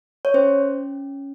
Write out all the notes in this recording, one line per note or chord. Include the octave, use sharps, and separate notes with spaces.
C#5
C#4 C5